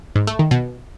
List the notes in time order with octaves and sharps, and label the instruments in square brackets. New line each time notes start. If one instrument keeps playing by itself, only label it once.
[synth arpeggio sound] G#2
A3
D#3
B2